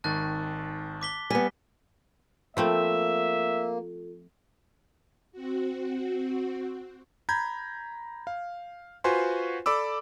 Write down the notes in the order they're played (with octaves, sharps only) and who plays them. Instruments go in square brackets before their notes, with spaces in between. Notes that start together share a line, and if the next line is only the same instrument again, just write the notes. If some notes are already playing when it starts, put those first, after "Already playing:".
[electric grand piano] G#1 D#3 C#6 [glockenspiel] A5 F#6 A6
[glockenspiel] D6 B6 G7
[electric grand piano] G3 [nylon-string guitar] B3 G#5 [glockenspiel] B6
[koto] F3 A3 C4 [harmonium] A#3 [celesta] F4 A4 [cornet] E5
[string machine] C4 F#4
[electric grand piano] A#5 B5 G6 G#6
F5
F4 F#4 B4 C5 G#5 C6
A4 D5 B5 D6 E6